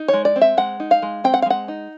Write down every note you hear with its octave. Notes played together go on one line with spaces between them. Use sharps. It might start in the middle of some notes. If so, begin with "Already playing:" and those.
Already playing: D#4
C#5
G#3
D5
C4
E5
G#3 F#5
D#4
F5
G#3
C4 G5
F#5
F5
G#3 F#5
D#4